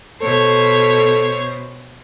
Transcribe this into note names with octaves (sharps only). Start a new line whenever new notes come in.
B2 A4 C5 C#5